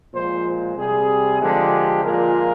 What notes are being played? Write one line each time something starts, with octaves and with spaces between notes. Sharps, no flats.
A#2 F3 G#3 C5
C3 G3 G#4
D3 F3 G#3 G4
A#2 F3 G#3 A#4